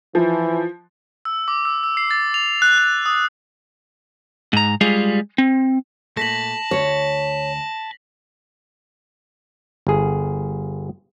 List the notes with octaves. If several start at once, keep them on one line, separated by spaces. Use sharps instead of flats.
E3 F3
E6
D6
E6
E6
C7
A6
F7
F#6
F#6
D#6
G#2 A#5
G3 G#3 F4 G4 G#4
C4
A#2 A3 A5 A#6 B6 F#7
D2 C#5
G1 G#4